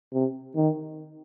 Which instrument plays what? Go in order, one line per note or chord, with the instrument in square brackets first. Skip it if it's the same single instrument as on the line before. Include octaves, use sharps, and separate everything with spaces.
[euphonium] C3
D#3